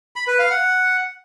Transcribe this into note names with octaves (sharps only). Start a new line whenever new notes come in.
B5
B4
F5
F#5